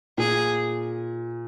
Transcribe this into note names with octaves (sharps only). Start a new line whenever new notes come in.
A#2 G#4